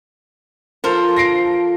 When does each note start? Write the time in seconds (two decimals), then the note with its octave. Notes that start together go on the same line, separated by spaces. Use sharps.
0.84 F3 A4 A#4 C5
1.16 A#6 C7 D7